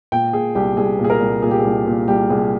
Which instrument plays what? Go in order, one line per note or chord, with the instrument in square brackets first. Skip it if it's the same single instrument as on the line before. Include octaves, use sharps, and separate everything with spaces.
[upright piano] A#2 G5
A#2 G#4
C2 G4
C2 G#4
A#2
G#4
A#4
C2
A#2 G#4
G4
G#4
C2
A#2
C2 G4
C2 G#4